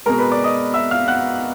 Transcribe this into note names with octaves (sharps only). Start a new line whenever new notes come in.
B2 G#3 A#4 A#5
B4 B5
D5 D6
D#5 D#6
E5 E6
F5 F6
F#5 F#6